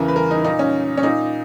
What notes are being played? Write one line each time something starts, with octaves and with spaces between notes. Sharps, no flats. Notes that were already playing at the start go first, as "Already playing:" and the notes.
Already playing: E2 C#3 E3 A#4
B4
A#4
D#4
A#2 D#4
C#4
C#4
A#2 D#4